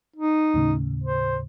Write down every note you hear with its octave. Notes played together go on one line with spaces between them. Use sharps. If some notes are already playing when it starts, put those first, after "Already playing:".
D#4
D#2 A2 C#3
C5